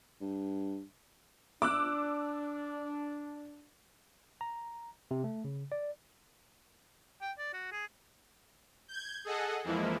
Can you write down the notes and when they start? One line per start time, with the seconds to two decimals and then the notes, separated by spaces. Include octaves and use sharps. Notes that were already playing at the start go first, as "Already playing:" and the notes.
0.21 G2
1.62 D4 D6 E6 F#6
4.41 A#5
5.11 C3
5.24 A3
5.44 C#3
5.72 D5
7.21 G5
7.38 D5
7.53 F#4
7.72 G#4
8.88 G6 G#6
9.25 G#4 A4 D#5 F#5
9.64 F2 E3 F3 G#3 A#3 E4